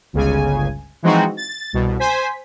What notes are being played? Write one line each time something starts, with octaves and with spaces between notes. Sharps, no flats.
G1 C#2 C#3 G#5
E3 F3 G#3 C4 D#4 F#4
A6
C2 B2
C5 G#5 B6